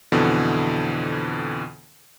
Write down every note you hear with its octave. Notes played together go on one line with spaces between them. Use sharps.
F2 B2 D3 E3